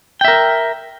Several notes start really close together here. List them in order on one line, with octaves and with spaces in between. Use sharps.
G5 E5 A#4